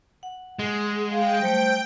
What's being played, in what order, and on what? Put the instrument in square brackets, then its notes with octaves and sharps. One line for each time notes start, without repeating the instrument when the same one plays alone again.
[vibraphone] F#5
[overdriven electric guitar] G#3
[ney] F5 [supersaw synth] G5
[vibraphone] F#3 G3 A3 [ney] C5